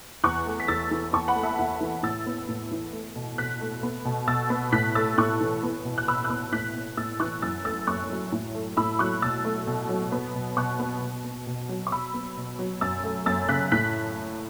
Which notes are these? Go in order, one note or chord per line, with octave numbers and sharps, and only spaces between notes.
E2 C#6 F#6
A3
B6
E2 E6 A6
E3
E2 A5 C#6
F#5 B5
A3
E5 A5
E2 F#5
E3
A2 E6 A6
B3
A2
E3
A3
B2
B2 F#6 B6
A3
B3
B2
B2 E6 A6
B3
A2 F#6 B6
A3 E6 A6
A2 C#6 F#6
E3
B3
B2
F#6
B2 B5 E6
F#6
B3 B5 E6
A2 F#6 B6
B3
A2 E6 A6
E3 C#6 F#6
F#2 E6 A6
A3 E6 A6
F#2 C#6 F#6
F#3
A2
A3
A2 B5 E6
F#3 C#6 F#6
B2 E6 A6
A3
B2
F#3
B3
B2
B2 C#6 F#6
B3
B2
B3
B2
F#3
C#6
B2 B5 E6
B3
B2
F#3
F#2 E6 A6
A3
F#2 E6 A6
C#3 F#6 B6
A2 F#6 B6